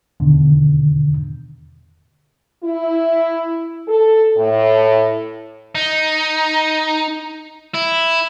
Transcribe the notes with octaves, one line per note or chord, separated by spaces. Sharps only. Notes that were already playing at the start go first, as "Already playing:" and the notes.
E2 B2 D3 D#3
E4
A4
A2
D#4
E4